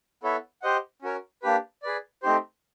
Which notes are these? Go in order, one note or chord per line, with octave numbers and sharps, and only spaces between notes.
B3 E4 A4 C#5 E5
G4 C5 D#5 F#5
C#4 F#4 A#4 C#5
A#3 D4 G4 B4
G#4 B4 D5
A3 C4 D#4 G4 C5